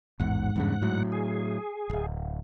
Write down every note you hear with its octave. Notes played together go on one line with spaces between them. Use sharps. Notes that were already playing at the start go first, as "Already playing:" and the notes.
A1 E2 G#2 F#5
E2 G2 C#3
A2 F#3
G#4
D1 G#1